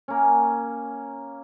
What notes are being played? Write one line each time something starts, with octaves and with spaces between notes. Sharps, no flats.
A#3 C#4